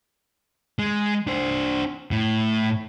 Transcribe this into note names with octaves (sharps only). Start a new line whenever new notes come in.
G#3
D4 C5
A2